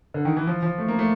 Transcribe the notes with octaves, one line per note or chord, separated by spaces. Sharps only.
D3
D#3
E3
F3
F3
A3
A#3
A3